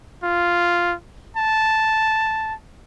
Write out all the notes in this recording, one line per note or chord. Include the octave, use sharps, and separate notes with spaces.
F4
A5